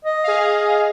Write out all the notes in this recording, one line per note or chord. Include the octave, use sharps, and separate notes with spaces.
D#5
G#4 F5